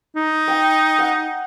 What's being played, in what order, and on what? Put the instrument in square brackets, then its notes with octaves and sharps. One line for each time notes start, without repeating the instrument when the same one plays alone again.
[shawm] D#4
[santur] G5
F#5